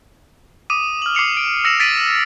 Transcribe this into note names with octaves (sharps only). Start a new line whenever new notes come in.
D6 D#6 D#7
F6 F#7
D6 C7 C#7 F7
D7
E6 A#6 C#7 E7 F7
A6 B6 D7 D#7